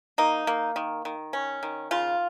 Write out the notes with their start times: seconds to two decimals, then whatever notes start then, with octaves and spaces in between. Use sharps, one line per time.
0.18 A#3 D#4
0.47 A#3
0.76 D#3
1.05 D#3
1.33 C#4
1.63 D#3
1.91 C#3 F4